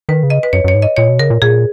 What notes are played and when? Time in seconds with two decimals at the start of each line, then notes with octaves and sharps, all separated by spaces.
0.09 D#3 B4
0.23 C#3
0.30 D#5
0.43 B4
0.53 F#2 C#5
0.64 F#2 C#5
0.75 G#2
0.82 D#5
0.97 A#2 C#5
1.08 B2
1.19 C#3 A#4
1.30 A#2
1.42 A#2 G#4